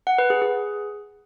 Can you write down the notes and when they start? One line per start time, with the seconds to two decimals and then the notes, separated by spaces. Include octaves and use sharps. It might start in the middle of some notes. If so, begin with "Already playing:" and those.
0.07 F#5
0.18 B4
0.30 G#4
0.42 G#4